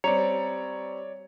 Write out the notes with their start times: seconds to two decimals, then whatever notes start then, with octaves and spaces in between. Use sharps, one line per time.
0.04 G3 C4 C#5 D5 A#5 C#7 F7